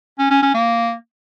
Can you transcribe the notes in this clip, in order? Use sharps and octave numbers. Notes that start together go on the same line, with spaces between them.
C#4
C#4
C#4
A#3